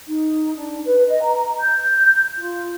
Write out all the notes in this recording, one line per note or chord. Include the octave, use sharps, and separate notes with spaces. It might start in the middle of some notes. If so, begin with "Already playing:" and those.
D#4
D4
B4
D#5
A#5
G6
F4